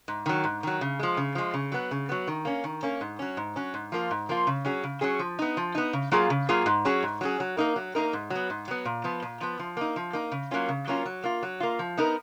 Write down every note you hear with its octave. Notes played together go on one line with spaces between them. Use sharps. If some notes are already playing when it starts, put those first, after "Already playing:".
G#2
D#3 F#3
G#2
D#3 F#3
C#3
F3 G#3
C#3
F3 G#3
C#3
F#3 B3
C#3
F#3 B3
D#3
A#3 C#4
D#3
A#3 C#4
G#2
F#3 C#4
G#2
F#3 C#4
G#2
F3 A#3 F4
G#2
F3 A#3 F4
C#3
F#3 C#4 G#4
C#3
F#3 C#4 G#4
F3
B3 D#4
F3
B3 D#4
C#3
F#3 A#3 F4 G#4
C#3
F#3 A#3 F4 G#4
G#2
F#3 C#4 G#4
G#2
F#3 C#4 G#4
F#3
A#3 D#4 A#4
F#3
A#3 D#4 A#4
G#2
F#3
B3
G#2
F#3 B3
A#2
F3 B3
A#2
F3 B3
F3
A#3 D#4
F3
A#3 D#4
C#3
F#3 A#3 C#4 F4
C#3
F#3 A#3 C#4 F4
F#3
A#3 F4
F#3
A#3 F4
F3
B3 D#4 A#4